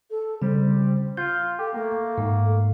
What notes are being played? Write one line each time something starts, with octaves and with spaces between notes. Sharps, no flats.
A4
C#3 G3 C4
F4 G6
G4 A4
A3 A#3
G#2